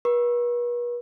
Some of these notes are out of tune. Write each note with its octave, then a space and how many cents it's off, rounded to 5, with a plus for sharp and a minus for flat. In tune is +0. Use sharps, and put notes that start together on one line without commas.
B4 -40 C#6 -30